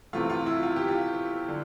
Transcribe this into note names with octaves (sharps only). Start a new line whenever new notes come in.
C3 E3 A3 F4
F4
E4
F4
G4
F4
D3